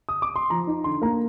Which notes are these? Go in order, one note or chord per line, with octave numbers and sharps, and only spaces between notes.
D#6
D6
C6
F3 A#5
D#4
D3 C6
A#3 A#5